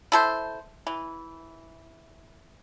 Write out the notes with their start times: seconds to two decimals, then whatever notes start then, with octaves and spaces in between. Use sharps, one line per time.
0.12 E4 A4 C5
0.87 E3